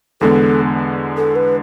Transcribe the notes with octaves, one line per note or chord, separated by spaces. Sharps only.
E2 D3 G#3 B3 A4
A4
B4